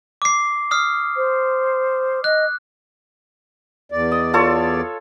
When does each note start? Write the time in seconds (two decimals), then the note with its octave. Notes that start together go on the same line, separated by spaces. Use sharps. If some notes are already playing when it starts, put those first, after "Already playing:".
0.22 D6 C7
0.71 D#6 F6 C7
1.17 C5
2.24 D#5 F#6
3.92 E2 D5
4.12 D#5
4.33 F4 A4 C#5